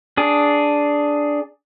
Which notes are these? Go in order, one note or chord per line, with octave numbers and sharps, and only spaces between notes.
D4 G#4